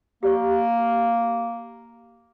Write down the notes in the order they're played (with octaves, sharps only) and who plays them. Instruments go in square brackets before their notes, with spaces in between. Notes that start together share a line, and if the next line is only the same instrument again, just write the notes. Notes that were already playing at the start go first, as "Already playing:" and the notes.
[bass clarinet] A#3 [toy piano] G4 D5 C#6